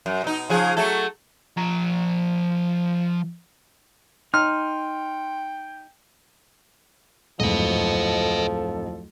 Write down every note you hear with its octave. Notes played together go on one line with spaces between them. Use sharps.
F#2
B2 D#4
C#3 F3 G#4
F#3 A3 A4
F3 A#5
D#4 G5 C6 F6
D1 F2 G#2 F3 A4 B4 D#5